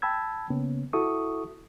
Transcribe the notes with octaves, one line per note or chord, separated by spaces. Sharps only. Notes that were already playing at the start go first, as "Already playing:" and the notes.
G5 A5 B5 E6 G#6
C#3 A#3 B3 C#4
E4 F#4 A4 E5 C#6 D#6